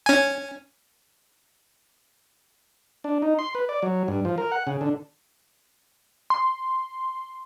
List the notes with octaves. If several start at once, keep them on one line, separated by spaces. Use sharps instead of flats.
C#4 G#5
D4
D#4
C6
B4
D5
F#3
G2
F3
A#4
F#5
C#3
D3
C6